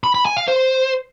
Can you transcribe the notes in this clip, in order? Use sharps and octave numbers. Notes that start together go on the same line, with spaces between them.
B5
B5
G#5
F5
C5